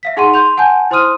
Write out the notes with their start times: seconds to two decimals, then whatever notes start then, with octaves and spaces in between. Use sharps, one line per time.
0.03 E5 F5 B6
0.17 D#4 G#4 F#5 C6 C#6 D#7
0.34 C6 G6 F7
0.57 F#5 G#5 A5 G6
0.91 E4 C5 C6 D#6 F6 D#7